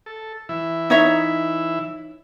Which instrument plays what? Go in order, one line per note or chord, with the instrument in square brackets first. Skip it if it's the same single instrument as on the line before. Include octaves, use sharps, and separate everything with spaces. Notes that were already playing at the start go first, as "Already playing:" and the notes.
[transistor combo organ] A4
E3 E4
[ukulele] D#4 C#5 E5